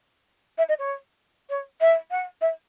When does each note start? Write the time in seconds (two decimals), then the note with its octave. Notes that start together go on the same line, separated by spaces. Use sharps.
0.58 E5
0.68 D#5
0.79 C#5
1.49 C#5
1.81 E5
2.11 F#5
2.41 E5